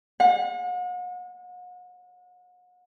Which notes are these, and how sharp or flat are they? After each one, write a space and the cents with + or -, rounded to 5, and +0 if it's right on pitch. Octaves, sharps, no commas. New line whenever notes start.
F#5 -40